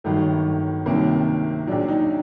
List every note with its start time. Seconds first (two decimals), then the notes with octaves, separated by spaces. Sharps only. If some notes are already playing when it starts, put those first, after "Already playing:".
0.04 G1 G2 D#3 F#3 A3
0.86 C2 C3 D#3 F#3 A#3
1.67 A#1 A#2 F#3 D4
1.88 D#4